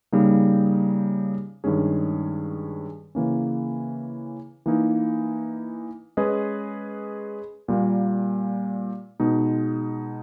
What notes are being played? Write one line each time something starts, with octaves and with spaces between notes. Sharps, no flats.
C#3 G3 A#3 D#4
G2 D#3 G#3 C#4 G#4
C#3 E3 A#3 C#4
E3 A#3 D#4
G#3 C#4 G#4 B4 D#5
A#2 G3 A#3
B2 G#3 D#4